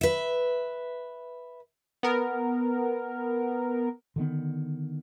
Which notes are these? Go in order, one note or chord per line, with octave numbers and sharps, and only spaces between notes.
B4 E5
B3 A#4
D3 D#3 B3